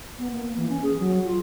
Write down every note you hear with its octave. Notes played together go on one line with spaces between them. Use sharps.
B3
A#3
E3
C#4
G#4
F#3
F4